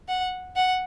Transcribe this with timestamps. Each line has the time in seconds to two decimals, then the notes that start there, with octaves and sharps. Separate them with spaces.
0.08 F#5
0.56 F#5